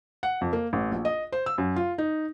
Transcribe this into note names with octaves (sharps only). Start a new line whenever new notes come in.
F#5
F2
A#3
A1
A#1
D#5
C5
E6
F#2
F4
D#4